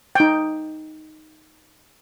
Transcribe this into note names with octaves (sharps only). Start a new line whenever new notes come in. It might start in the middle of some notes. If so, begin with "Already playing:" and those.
D#4 G5